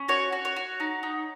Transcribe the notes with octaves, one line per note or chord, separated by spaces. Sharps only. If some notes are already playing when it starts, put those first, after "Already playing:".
Already playing: C#4
F#4 C#5
F#4
C#5
F#4
D#4
D#4